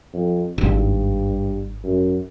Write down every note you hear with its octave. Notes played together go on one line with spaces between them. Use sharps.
F2
D#1 G#1 G2
F#2